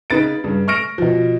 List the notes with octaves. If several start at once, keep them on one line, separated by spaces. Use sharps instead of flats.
C#3 D#4 B4 A6 D7
G2 C#3
C#6 F6 A#6 D7
B2 F3